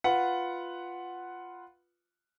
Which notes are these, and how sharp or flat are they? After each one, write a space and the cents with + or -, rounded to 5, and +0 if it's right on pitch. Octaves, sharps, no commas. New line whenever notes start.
F4 +0 B4 +0 F#5 +0